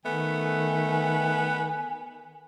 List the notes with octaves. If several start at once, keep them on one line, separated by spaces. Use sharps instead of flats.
D#3 A3 B3 G#5